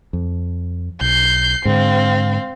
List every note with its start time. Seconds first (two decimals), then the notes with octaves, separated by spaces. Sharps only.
0.13 F2
1.01 B1 G6 C7
1.65 G#2 D3 C4 F5